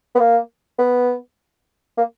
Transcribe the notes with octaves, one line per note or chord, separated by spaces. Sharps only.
B3
A#3
B3
A#3